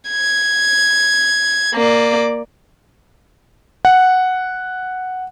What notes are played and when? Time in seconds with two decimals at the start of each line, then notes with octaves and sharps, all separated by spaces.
0.10 G#6
1.75 A#3 D5
3.85 F#5